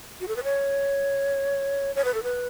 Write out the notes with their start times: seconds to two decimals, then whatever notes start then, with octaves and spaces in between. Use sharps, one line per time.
0.20 F#4
0.28 A4
0.36 B4
0.44 C#5
1.95 C#5
2.04 B4
2.14 A4
2.23 B4